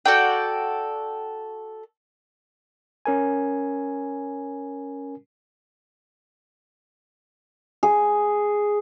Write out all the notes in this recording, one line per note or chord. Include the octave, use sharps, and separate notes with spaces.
F#4 A4 D5 G5
C#4 A#4 G#5
G#4